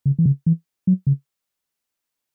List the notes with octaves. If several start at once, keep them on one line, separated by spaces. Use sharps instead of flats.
C#3
E3
C#3
E3
F#3
C#3